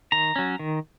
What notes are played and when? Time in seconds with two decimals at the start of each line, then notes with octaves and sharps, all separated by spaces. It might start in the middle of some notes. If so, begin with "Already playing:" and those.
0.12 D#3 A#5
0.36 F#3 C#4
0.59 D#3